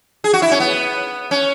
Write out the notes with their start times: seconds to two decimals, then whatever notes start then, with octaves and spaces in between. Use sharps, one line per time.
0.24 G#4
0.33 F#4
0.42 E4
0.51 C#4
0.60 B3
1.31 C#4